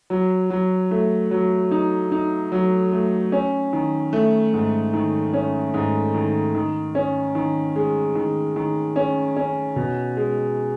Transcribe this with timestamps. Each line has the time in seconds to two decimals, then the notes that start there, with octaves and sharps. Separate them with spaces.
0.10 F#3
0.50 F#3
0.91 A3
1.31 F#3
1.71 D#4
2.12 D#4
2.52 F#3
2.92 A3
3.32 C#4
3.73 D#3
4.13 A3
4.53 G#2
4.93 D#3
5.33 C#4
5.74 G#2
6.14 D#3
6.55 D#3
6.95 C#4
7.35 D#3
7.76 G#3
8.15 D#3
8.56 D#3
8.96 C#4
9.37 C#4
9.76 B2
10.17 G#3